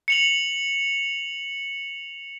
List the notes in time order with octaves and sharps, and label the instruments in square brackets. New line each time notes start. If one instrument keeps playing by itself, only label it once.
[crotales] C#7 F7 F#7